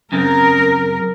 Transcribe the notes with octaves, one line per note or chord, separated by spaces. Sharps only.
F#2 C#3 C4 A#4